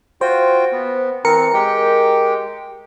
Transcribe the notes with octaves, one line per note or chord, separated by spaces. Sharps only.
F4 F#4 C5 G5
B3
E3 C4 A#4 C#7
G#3 G4 G5